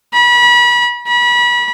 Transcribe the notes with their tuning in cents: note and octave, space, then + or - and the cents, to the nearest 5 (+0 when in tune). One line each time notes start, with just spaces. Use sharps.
B5 -30
B5 -30